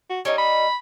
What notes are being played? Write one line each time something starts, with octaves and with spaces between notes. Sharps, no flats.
F#4
G3 D#4 C#5
B5